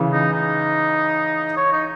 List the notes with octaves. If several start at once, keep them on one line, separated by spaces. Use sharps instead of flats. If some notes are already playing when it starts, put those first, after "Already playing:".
Already playing: C#3 E3
D#4
D#4
C#5
D#4